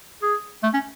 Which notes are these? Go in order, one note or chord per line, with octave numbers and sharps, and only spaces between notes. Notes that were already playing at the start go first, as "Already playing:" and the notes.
G#4
A3
C#4